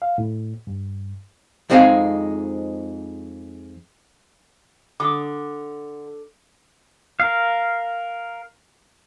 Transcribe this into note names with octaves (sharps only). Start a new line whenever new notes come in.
F5
A2
G2
F2 G#3 C4 D#4 G#4 F5
D3 D6 D#6
A#4 F5